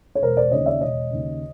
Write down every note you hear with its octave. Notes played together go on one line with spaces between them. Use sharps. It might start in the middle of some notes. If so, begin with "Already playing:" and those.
C#5
E1 A#4 C5
C5 D5
D#2 C#3 C#5 D#5
D5 E5
E1 C#5 D#5
D#2 C#3